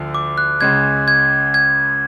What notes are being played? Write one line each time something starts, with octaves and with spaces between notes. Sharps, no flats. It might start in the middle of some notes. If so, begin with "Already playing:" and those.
Already playing: D2 D3 F3
D6
F#6
C#2 C#3 G#3 G#6
G#6
G#6